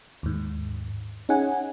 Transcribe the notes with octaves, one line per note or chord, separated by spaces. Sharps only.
D#2 G#2
C#4 D#4 G#4 F#5 G#5